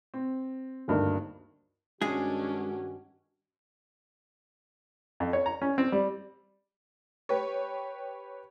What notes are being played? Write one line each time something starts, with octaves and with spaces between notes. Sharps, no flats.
C4
G#1 D2 G2 A#3 D#4 A#4
G2 D#3 G#3 C#4 D4 F#4 G#4
F2
C#5
A#5
C#4
C4
G3
G4 B4 C#5